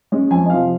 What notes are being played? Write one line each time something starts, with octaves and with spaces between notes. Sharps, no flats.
G#3 C#4
F2 G#5
D#5
C3 F3 F5